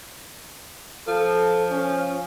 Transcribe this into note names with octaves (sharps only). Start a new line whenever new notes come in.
F3 A4
C#4